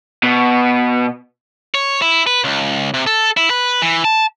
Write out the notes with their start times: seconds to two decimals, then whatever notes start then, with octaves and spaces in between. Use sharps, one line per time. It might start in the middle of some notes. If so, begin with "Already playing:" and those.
0.23 B2
1.75 C#5
2.02 E4
2.27 B4
2.44 C#2
2.94 C3
3.07 A4
3.37 E4
3.50 B4
3.82 E3
4.05 A5